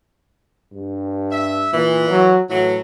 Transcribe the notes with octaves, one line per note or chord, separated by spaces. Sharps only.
G2
E5
A#2 E3
F#3
A2 E3 F#3